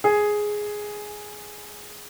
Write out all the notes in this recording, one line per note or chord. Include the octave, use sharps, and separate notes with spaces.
G#4